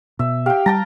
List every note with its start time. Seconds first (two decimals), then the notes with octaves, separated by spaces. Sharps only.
0.19 B2 E5
0.46 G4 F5 G5
0.66 G3 G5 A5 A#5